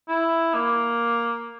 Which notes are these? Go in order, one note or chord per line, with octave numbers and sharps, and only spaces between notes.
E4
A#3